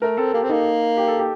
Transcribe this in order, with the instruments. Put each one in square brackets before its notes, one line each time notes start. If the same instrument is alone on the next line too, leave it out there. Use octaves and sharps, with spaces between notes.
[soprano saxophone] A3 [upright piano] A#4
[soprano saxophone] C4 [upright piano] A4
[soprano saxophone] A#3 [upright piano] G4
[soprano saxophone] C4
[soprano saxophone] A#3 [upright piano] D#4
[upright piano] G4
A4
G4